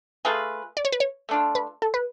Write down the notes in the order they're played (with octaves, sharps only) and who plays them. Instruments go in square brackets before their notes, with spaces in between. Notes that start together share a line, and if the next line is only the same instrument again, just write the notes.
[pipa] A3 F4 G#4 B4
[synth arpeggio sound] D5
C#5
B4
C#5
[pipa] A3 D4 F4
[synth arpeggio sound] B4
A4
B4